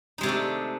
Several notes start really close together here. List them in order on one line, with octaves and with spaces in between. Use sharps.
D#4 G#3 C3 D4 A3